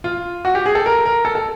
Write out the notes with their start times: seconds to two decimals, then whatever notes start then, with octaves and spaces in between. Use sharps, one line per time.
0.04 F4
0.45 F#4
0.55 G4
0.66 G#4
0.75 A4
0.86 A#4
1.05 A#4
1.25 A4
1.35 A4